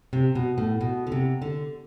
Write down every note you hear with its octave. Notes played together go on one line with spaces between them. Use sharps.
C3
B2
A2
B2
D3
C3
D3